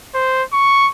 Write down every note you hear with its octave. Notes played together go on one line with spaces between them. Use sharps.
C5
C#6